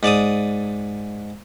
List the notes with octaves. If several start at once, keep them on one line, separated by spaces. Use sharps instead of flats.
G#2 D5 D6 D#6